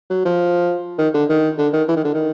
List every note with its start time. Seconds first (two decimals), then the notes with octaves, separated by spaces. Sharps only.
0.10 F#3
0.25 F3
0.98 D#3
1.14 D3
1.29 D#3
1.58 D3
1.73 D#3
1.88 E3
1.96 D#3
2.04 D3
2.14 D#3